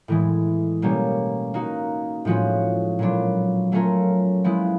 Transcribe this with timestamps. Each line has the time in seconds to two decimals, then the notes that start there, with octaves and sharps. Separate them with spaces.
0.08 A2 E3 G#3
0.82 B2 G3 A#3 C#4
1.54 A#3 D#4 F#4
2.25 A2 F3 G#3 C#4 F#4
2.99 A#2 F#3 B3 D4
3.72 F#3 A3 C#4 F4 A#4
4.44 F3 G#3 B3 E4